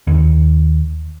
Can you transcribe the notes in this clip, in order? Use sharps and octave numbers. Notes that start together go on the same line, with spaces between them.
D#2